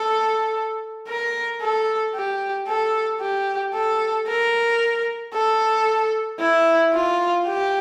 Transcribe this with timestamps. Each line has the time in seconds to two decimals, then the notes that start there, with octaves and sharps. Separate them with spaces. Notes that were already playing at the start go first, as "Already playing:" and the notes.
Already playing: A4
1.08 A#4
1.61 A4
2.15 G4
2.68 A4
3.21 G4
3.74 A4
4.27 A#4
5.34 A4
6.40 E4
6.93 F4
7.47 G4